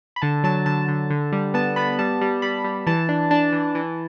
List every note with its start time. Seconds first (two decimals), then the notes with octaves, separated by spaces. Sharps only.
0.16 B5
0.22 D3 A5
0.44 F#3 A5
0.66 D3 A5
0.88 D3
1.10 D3
1.32 G3
1.54 B3 A5
1.76 B3 B5
1.99 G3 A5
2.21 G3
2.42 G3 B5
2.64 G3
2.87 E3 A5
3.09 D4
3.31 D4 A5
3.53 E3
3.75 E3